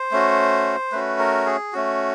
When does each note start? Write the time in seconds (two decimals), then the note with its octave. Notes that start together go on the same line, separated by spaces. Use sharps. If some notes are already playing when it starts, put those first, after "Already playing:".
Already playing: C5
0.12 A3 C#4 F#4
0.92 A3 C#4 F#4 B4
1.19 A#4
1.46 G#4
1.73 A3 C#4 F#4